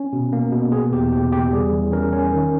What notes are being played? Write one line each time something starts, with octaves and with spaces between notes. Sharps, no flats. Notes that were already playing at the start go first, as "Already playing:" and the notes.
Already playing: C#4
B2
A#3
B2
B3 G#4
E2 G4
C#3 G4
E2 G4
G3 G#4
E3
C#4 A#4
C#4
D#3